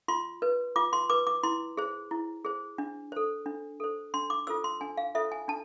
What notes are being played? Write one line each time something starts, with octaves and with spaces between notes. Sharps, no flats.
F4 C6
B4
F4 D6
C6
B4 D6
D6
E4 C6
G#4 C5
E4
G#4 C5
D4
A4 C5
D4
A4 C5
D4 C6
D6
F4 A4 C5 E6
C6
D4 G#5
F5
F4 A4 C5 E5
G#5
D4 A5